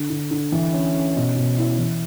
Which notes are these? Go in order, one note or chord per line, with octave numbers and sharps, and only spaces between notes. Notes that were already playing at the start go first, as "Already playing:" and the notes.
Already playing: D3
D3
D3
E3
C#4
C#4
B2
B2
E4
E3